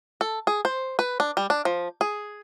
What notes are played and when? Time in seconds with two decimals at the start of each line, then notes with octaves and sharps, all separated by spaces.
0.21 A4
0.47 G#4
0.65 C5
0.99 B4
1.20 D4
1.37 G3
1.50 D4
1.65 F3
2.01 G#4